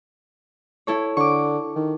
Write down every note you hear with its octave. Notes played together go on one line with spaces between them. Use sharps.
E4 A4 C#5
D3 C#6 D6
D#3